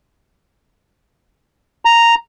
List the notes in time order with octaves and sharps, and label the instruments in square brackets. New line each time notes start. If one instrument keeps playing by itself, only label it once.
[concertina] A#5